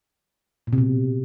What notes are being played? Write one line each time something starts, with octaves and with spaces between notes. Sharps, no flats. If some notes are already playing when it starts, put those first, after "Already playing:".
A#2
C3
B2